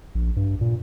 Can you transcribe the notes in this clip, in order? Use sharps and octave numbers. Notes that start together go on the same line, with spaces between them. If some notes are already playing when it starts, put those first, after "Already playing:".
A#1
G2
A#2